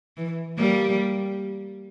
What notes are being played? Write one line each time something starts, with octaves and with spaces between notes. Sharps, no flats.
E3
G3 A#3